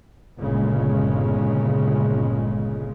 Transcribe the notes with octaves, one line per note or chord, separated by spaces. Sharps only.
G1 A#2 C#3 G#3